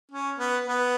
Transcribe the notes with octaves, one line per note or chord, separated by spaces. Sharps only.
C#4
B3
B3